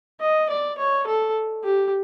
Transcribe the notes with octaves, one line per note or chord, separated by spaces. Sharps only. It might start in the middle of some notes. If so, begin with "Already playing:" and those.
D#5
D5
C#5
A4
G4